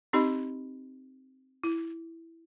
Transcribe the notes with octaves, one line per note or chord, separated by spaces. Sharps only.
C4 D#4 G4 D#5 B5
E4